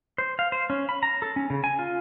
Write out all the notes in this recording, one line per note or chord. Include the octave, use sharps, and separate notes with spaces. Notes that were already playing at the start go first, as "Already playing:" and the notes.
C5
F5
C5
C#4
B5
A#5
A4
C#4
C#3
G#5
F4